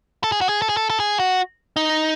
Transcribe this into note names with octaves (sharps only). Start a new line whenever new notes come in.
A4
G#4
F#4
G#4
A4
G#4
A4
A4
G#4
F#4
D#4